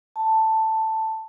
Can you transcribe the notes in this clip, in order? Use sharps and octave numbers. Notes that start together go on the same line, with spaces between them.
A5